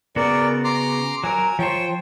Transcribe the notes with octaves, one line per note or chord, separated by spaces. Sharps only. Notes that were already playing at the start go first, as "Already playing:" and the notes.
C#3 B3 F#4 A#4 D5
A#5 C6 D6
F#3 A#4 G#5 A#5
F3 C5 C#5 G5